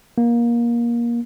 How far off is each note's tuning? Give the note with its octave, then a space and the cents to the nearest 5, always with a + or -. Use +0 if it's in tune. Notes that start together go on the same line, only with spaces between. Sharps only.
A#3 +20